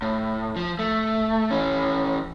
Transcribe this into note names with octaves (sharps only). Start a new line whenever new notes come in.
A2
F3
A3
E3 C#4